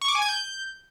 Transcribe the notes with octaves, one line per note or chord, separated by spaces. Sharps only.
C#6
D6
G#5
G#6
G6